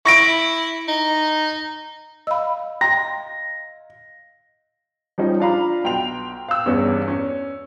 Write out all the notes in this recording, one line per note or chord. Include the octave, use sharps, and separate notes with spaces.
E4 C#6 A#6 D7
D#4
D#5 F5 B5 E6
G5 A#5 C6 A#6
F3 G3 C#4 D#4
D4 F4 F5 A#5 B5
B1 G5 C6 F7
F5 E6
E2 G2 B3 C#4
C#4